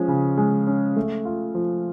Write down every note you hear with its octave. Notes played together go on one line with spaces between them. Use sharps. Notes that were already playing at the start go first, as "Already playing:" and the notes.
Already playing: F3 G#3 C#4
C#3
G#3
C#4
A3
F4
F3